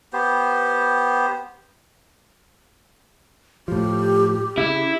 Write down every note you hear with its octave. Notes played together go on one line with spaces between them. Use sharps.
B3 G4 C5
A2 F3 G4
C#3 E4